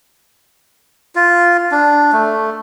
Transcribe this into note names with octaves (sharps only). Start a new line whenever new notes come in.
F4
D4
A3